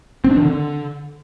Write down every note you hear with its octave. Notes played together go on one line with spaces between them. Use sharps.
C4
D4
D#3
D3